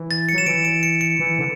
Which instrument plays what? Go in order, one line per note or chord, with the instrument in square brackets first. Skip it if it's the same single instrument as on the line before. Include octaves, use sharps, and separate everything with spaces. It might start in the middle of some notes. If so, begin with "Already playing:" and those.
Already playing: [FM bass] E3
[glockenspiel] A6
C#7
[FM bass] F#3 [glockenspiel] E7
[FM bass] E3 [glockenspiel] D7
[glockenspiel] D7
C#7
C#7
[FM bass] E3
D3